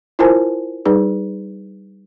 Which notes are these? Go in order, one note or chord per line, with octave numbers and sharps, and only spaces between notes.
E4 F4 A#4 C5 G#5 A5
G3 D#4 G#4 B4